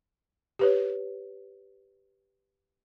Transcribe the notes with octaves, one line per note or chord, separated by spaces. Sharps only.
G4 B4 C#5